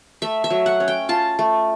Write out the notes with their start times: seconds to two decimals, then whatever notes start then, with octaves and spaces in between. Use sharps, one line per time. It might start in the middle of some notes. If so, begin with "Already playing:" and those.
0.22 A3 E5
0.44 E5
0.50 F#3
0.66 F#5
0.80 C#4
0.88 G5
1.09 F4 A5
1.39 A3